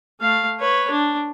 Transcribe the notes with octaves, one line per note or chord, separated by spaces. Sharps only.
A3 F5
B4 C#5
D4